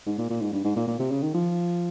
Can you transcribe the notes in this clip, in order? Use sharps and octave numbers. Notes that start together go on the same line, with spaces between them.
G#2
A#2
A#2
G#2
G2
G#2
A#2
A#2
C3
C#3
D#3
F3